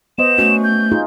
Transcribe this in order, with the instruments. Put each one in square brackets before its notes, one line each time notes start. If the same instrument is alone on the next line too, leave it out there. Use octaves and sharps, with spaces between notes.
[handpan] B3 C5 D#5 [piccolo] E7
[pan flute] A3 [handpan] C#4 F#4
[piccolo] G6
[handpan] D#4 F4 G#4